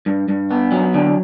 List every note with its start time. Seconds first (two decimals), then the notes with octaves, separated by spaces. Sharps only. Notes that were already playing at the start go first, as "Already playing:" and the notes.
0.06 G2
0.28 G2
0.51 B3
0.72 F#3
0.94 D3